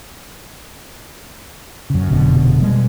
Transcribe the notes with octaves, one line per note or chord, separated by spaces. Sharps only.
F#2 C#3
F1 B2 D3
B2 G3 G#3